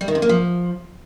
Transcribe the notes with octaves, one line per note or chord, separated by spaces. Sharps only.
G3
D#3
C3
A#3
F3